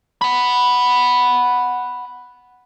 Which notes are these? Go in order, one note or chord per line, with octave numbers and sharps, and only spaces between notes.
F#5 B5